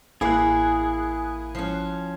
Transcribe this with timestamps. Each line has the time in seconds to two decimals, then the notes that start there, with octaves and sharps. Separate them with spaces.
0.21 A1 A#3 E4 G#4 F#6
1.55 F3 C#4